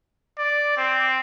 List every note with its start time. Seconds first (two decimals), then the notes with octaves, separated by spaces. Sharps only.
0.38 D5
0.77 C4